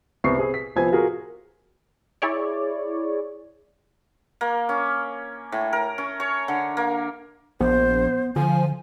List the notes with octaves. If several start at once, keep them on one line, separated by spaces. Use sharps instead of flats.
C2 B3 C4 C#6 C7
C4 G#4 B4
B6
C2 F3 B3 C4 G#5 G#6
F4 F#4 G#4 A#4
E4 G#4 C#5 D5
A#3
C#4
A2
A#4
C#4
C#5
D3
A#3
A#1 B3 C5
D3 F3 G#5